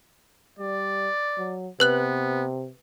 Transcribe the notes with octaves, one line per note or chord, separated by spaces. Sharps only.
G3 D5
F#3
C3 B3 B4 F#6 F#7